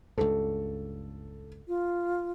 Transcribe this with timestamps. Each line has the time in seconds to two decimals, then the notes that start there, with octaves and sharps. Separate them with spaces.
0.18 C#2 G2 A4
1.68 F4